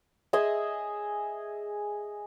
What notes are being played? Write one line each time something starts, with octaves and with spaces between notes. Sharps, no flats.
G#4 D#5 E5 G#5